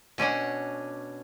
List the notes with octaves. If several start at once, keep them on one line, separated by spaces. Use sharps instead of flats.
B2 C#4 D4 F#5